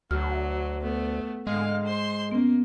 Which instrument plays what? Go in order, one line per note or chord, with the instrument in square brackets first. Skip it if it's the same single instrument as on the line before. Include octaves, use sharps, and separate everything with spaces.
[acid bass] D2 [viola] F#3 [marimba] F#4 F6
[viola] A3 B3
[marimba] G#2 [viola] D3 F5 [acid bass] G#3
[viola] C5 C6
[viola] A#3 [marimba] B3 C#4